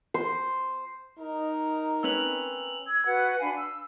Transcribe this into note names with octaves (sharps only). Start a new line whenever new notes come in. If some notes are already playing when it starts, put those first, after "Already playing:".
C5
D#4 A#4
C4 C#4 B4 E6 F7 F#7
E6 G#6
F#4 B4 F#5
D4 F5 G#5 B5
E6